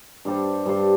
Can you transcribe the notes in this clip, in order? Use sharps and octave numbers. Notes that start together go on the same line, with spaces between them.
G2 G3 D4 C5
G2 G3 D4 C5